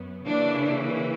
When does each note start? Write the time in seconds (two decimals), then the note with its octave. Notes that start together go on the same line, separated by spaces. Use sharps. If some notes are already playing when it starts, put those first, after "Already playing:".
Already playing: F#2 B3
0.25 C#3 E3 A#3 D4